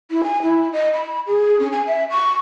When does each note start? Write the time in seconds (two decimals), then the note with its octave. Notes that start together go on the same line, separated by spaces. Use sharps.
0.11 E4
0.24 G#5
0.43 E4
0.73 D#5
0.93 B5
1.27 G#4
1.59 C#4
1.72 G#5
1.87 E5
2.11 C#6